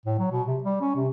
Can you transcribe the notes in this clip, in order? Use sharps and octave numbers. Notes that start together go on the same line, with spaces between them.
A2
F#3
B2
C3
G3
C#4
C3